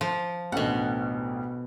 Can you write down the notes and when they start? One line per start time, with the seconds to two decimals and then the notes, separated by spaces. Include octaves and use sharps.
0.01 F3
0.52 A1 D2 B2 F#5